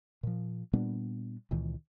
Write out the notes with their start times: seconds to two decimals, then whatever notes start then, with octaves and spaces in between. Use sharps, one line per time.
0.23 A#2 F3
0.73 A#2 G3 B3 D4
1.51 C#2 A#2 D#3 E3